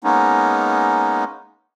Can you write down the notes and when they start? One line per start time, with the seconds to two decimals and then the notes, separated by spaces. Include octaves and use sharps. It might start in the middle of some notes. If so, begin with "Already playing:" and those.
0.04 G#3 A#3 B3 C#4 D#4